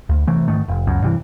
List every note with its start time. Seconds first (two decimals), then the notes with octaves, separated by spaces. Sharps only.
0.09 D2
0.27 C3 E3 A3
0.48 G#2 D#3 A3
0.68 F1
0.87 C#2 F#2
1.02 G2 C3 E3